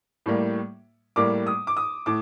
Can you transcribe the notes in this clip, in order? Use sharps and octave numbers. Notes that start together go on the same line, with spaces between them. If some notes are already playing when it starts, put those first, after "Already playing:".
A2 G3 A#3
A2 G3 A#3 D6
D#6
D6
D#6
A2 D6